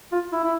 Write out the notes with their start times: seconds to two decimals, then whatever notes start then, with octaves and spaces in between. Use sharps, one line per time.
0.12 F4
0.32 E4
0.44 E4